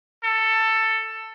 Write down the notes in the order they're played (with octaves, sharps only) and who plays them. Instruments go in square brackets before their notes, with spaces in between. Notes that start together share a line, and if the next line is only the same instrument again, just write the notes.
[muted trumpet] A4